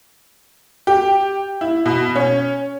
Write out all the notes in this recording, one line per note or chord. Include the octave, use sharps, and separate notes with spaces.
G4
E4
B2
C#4